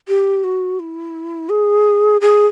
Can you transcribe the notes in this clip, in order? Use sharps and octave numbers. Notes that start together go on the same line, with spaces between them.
G4
F#4
E4
G#4
G#4